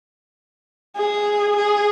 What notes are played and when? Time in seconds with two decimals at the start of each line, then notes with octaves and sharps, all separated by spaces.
0.97 G#4
1.57 G#4